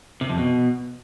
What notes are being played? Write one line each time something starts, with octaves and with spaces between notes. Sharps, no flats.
C3
F2
B2